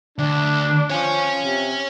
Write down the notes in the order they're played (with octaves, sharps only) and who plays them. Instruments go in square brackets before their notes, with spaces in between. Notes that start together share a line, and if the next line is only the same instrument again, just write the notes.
[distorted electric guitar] D2 [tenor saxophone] D4
[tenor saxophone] F3 [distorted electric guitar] C#5 G#5
[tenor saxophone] C3